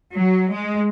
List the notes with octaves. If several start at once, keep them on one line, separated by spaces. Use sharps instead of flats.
F#3
G#3